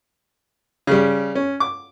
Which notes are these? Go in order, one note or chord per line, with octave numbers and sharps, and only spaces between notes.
C#3 G3
C#4
D6